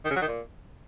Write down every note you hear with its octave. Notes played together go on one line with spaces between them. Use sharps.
D#3
C#3
F#3
D#3
A#2